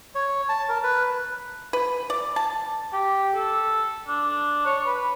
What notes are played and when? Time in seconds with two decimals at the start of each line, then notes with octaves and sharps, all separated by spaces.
0.15 C#5
0.49 A5
0.69 A#4
0.83 B4
1.73 B4
2.10 D5
2.36 A5
2.93 G4
3.34 A4
4.08 D4
4.65 C#5
4.86 B4